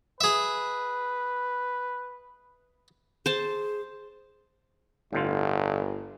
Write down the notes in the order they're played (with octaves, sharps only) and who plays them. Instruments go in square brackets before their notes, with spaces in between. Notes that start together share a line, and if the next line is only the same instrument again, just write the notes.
[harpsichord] G#4 E5 [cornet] B4
[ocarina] G#4 [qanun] C5 A5
[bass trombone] G1 [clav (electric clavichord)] A2 D3 F4